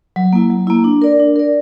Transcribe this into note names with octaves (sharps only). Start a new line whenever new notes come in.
F#3
A#3 E4
F#3
A#3 E4
D4
A#4 D5
D4
A#4 D5